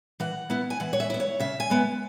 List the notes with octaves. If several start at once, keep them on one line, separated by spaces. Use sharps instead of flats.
E3 F#5
B3 E4
G#5
E3 F#5
C#5
E5
B3 E4
C#5
C#3 E5
G#5
G#3 B3